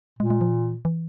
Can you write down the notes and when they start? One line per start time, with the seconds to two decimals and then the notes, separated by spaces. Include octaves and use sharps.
0.19 A#2 G#3
0.30 G#3
0.41 F3
0.52 E3
0.85 E3